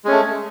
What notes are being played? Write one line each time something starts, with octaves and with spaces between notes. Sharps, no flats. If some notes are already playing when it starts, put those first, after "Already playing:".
G#3 A3 C#4